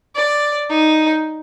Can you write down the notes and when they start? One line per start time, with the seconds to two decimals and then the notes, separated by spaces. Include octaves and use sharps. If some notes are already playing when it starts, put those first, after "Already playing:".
0.16 D5
0.70 D#4